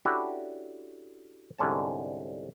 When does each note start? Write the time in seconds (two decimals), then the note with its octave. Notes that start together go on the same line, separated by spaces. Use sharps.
0.05 C#4 D4 E4 F#4 G4 A4
1.58 C2 G#2 D3 C#4 A5